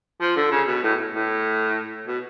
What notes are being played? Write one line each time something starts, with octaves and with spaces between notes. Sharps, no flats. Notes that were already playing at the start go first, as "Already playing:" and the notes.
F3
D3
C#3
B2
A2
A2
B2